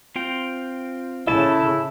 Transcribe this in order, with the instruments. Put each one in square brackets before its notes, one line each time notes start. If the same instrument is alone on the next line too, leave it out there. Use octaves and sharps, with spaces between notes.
[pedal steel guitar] C4 F4 G5
[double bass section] C#3 [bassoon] E4 [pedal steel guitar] A4 A5